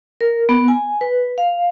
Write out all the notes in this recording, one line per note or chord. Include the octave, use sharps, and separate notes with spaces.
A#4
B3
G#5
B4
F5